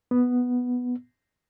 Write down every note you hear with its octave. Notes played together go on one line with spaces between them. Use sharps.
B3